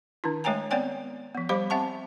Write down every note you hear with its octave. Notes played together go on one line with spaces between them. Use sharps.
D#3 D4 E4
G#3 A3 C#5 G5 G#5 A#5
B3 C4 C#5 D5 G5 G#5
F3 B3
G3 G4 C5 F5 B5 D6
C4 E5 F#5 A5 C#6